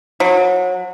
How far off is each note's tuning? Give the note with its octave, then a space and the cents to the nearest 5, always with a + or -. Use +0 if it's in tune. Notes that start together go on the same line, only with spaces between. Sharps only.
F#3 -30